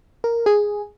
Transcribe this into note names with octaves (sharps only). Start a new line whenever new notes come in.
A#4
G#4